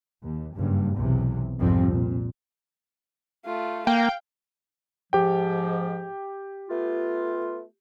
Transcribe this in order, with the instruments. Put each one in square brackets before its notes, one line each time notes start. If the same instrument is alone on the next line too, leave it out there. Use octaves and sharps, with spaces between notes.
[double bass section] D#2
F#1 G2
B1 E2 C3
C2 F2 G#2 F3 G3 C4
A#2
[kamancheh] A3 F4
[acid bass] A#3 [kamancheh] F5 [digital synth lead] G5
[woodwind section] G#2 F3 [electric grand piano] G4 G5
[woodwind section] A3 B3 F4